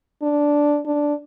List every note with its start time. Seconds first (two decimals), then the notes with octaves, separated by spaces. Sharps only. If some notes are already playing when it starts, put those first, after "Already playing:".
0.22 D4
0.86 D4